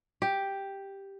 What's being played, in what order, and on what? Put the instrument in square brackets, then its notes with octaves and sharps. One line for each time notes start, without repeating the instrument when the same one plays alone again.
[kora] G4